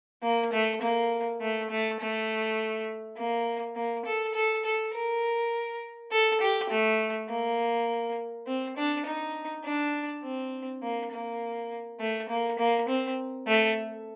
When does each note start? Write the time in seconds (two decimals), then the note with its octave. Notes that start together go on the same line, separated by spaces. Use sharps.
0.23 A#3
0.53 A3
0.81 A#3
1.41 A3
1.70 A3
2.00 A3
3.17 A#3
3.76 A#3
4.05 A4
4.34 A4
4.65 A4
4.94 A#4
6.12 A4
6.41 G4
6.70 A3
7.29 A#3
8.46 C4
8.76 D4
9.05 D#4
9.64 D4
10.23 C4
10.82 A#3
11.12 A#3
12.00 A3
12.29 A#3
12.58 A#3
12.88 C4
13.47 A3